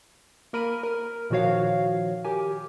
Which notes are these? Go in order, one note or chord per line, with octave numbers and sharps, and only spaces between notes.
A#3 A#4 B5 D#7
A#4
A#2 D#3 F3 F#4 C#5 F5
G4 A#4 G#5